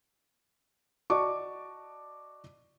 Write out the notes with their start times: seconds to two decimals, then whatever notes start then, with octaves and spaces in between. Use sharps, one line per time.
1.10 F#4 D5 D#5 A5 C#6 D6